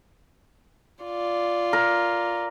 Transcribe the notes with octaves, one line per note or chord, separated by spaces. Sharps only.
F4 D5
A#4